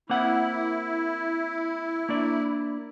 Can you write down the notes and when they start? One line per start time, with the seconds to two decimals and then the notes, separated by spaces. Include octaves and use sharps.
0.10 A#3 C4 E4 F#5
2.09 A#3 D4 D5